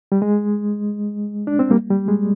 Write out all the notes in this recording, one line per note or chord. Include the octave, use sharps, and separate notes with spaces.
G3
G#3
D4
C4
G3 A#3
G3
G#3